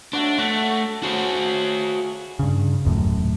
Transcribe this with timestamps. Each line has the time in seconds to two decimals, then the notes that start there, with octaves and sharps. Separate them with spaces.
0.13 A3 D4 F#4 C#5
0.38 A3 F#4
1.03 C#3 F#4 C5
2.39 G2 C#3
2.85 D#1 F#2 A2